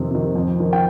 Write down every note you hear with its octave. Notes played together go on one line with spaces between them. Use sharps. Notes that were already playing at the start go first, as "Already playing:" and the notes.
Already playing: F2 C3 D#3
C3 D#3
F2
D#3
G5